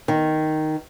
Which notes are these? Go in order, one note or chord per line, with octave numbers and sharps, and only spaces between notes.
D#3